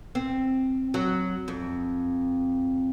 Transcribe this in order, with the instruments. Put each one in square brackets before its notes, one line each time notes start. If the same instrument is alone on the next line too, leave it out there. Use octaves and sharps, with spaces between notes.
[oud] C4
F#3
F2